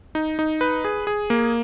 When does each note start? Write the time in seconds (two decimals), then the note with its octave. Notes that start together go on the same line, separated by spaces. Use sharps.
0.15 D#4
0.39 D#4
0.61 B4
0.84 G#4
1.07 G#4
1.30 A#3